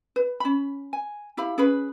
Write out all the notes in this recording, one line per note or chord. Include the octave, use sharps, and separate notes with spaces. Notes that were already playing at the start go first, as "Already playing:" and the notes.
B4
C#4 B5
G#5
E4 G4 F5 B5
C#4 G#4 B4 B5